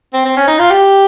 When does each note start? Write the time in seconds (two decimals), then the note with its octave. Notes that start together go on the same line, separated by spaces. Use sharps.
0.14 C4
0.25 C4
0.37 C#4
0.47 D#4
0.59 F4
0.70 G4